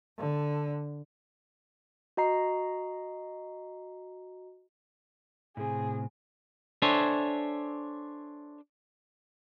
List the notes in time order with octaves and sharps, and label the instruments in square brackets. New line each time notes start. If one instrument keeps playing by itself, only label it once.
[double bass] D3
[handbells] F#4 D#5 A#5 C7
[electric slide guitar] A2 C3 [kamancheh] G#4
[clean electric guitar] D4 A4 C5 C#5 E5 G#5